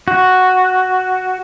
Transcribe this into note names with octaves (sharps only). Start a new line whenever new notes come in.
F#4